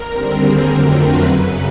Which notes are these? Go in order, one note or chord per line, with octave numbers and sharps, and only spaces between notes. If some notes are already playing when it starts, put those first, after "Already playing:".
Already playing: A#4
D#2 D3 G3 C4
G#4
F2 D3 F#3 A3 C4 A#4
B4
F#2 C#3 F#3 B4